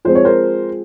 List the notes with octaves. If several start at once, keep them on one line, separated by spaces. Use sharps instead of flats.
F3 G#3 C4 C5
C#5
A#4 C5